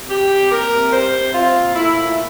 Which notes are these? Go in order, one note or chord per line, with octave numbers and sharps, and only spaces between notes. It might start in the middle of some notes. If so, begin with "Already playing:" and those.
Already playing: C3
G3 G4
C3
A#3 A#4
C3
G3 C5
C3
C4 F4
A#2
A3 E4
A#2
E4